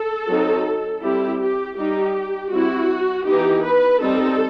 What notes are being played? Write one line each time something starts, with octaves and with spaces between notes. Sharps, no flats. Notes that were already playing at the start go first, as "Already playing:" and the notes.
Already playing: A4
F#3 C4 D#4
G3 C4 E4 G4
G4
G3 D#4 G4
G3 C4 E4 F#4
E3 B3 D#4 G4
B4
G3 C4 D#4 A4